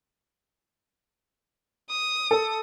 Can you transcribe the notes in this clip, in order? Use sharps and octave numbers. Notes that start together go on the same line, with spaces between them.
D#6
A4